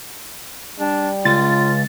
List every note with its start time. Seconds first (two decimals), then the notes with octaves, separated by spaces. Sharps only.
0.80 G3 D4
1.25 C#2 F4 A6